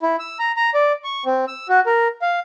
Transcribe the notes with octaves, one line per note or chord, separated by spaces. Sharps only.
E4
E6
A#5
A#5
D5
C#6
C4
E6
F#4
A#4
F5